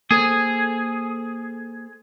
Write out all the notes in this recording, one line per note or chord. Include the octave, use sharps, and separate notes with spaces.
A#3 G#4 A4 C5